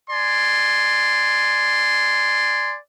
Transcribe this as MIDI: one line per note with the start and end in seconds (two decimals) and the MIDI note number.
0.10 2.75 74
0.10 2.75 80
0.10 2.75 84